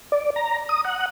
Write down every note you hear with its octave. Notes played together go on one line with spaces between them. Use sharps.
D5
A#5
D#6
F#5